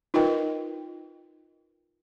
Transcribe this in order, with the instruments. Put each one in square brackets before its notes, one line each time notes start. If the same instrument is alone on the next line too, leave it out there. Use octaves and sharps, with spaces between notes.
[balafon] D#4 F4 A#4 B4 D#5 G5